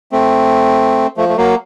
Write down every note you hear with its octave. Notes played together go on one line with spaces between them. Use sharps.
A3 C4
F3 A3
A3
F#3 A#3